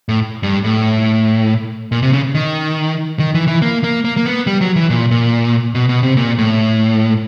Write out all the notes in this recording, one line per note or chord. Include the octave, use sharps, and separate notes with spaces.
A2
G2
A2
A#2
C3
C#3
D#3
D#3
E3
E3
A#3
A#3
A#3
A#3
B3
G3
F#3
E3
A#2
A#2
B2
B2
C3
A#2
A2